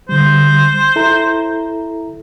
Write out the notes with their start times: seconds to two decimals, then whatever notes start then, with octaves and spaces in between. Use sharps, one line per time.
0.09 D3 G3 C5
0.96 E4 A4 A#5